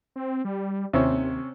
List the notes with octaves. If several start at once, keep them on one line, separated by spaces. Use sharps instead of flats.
C4
G3
D#2 C3 C4 C#4